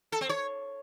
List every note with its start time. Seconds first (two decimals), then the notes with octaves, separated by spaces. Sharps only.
0.12 A4
0.21 C4
0.29 C#5